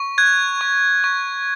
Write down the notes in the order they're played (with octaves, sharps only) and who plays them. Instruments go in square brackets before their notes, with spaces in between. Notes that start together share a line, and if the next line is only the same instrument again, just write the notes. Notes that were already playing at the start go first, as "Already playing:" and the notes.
Already playing: [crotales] C#6
F#6 G#6
C#6
C#6